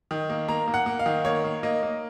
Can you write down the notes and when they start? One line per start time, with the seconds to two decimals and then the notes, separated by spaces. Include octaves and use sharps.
0.11 D#3
0.30 A#3
0.48 A#3 A#5
0.68 A#3
0.74 F#5
0.86 A#3
0.99 F5
1.06 D#3
1.25 A#3 C#5
1.44 A#3
1.63 A#3 D#5
1.83 A#3